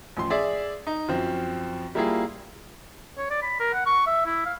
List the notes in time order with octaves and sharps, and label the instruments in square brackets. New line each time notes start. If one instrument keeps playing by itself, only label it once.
[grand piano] A1 F3 C6
G#4 D5 E5
D#4
F#2 F3 C4
G3 A#3 E4 F4 G#4
[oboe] C#5
D5
B5
A#4
F#5
C#6
E5
E4
F5